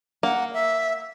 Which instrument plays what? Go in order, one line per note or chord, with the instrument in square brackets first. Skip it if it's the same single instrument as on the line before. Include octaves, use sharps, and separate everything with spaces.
[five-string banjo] A#3 [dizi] F#5
[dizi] E5